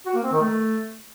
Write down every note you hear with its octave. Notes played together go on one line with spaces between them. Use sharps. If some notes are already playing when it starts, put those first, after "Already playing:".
F#4
A#3
C4
D#3
A3